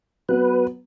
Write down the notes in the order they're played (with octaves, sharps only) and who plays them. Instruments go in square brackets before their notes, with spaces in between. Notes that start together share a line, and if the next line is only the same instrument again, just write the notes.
[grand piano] F#3 B3 [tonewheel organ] B4